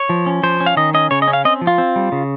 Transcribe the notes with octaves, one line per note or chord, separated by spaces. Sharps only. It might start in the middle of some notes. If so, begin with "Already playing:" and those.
Already playing: C#5
F3
C#4
F3 C5
C#4
F5
D#3 D#5
C#4 D#5
C#3 C#5
D#5
C#4
F5
C4 D#5
F3
F4
C4
G3
C#3